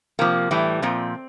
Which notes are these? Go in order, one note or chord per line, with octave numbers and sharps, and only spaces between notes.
C3 F3 A#3
A2 E3 G3
A#2 F3 C4